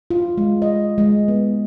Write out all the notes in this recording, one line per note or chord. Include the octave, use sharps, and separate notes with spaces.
F4
G#3
D#5
G#3
B3